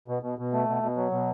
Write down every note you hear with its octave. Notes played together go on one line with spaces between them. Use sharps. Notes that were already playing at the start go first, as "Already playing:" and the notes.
B2
B2
B2
A3
B2
B2
F#3
B2